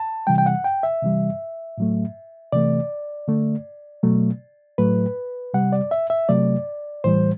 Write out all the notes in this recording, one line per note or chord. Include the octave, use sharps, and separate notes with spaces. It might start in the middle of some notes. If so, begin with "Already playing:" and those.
Already playing: A5
C3 E3 G3 G5
G5
F#5
G5
E5
C3 E3 G3
A2 F#3 A3
C3 E3 A3 D5
D3 A3
B2 F#3 A3
A2 F#3 A3 B4
C3 G3 F#5
D5
E5
E5
C3 F#3 A3 D5
A2 E3 G3 C5